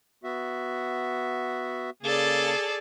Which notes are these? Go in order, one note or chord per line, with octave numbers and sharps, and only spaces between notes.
B3 F#4 E5
C#3 A#3 G#4 A4 D5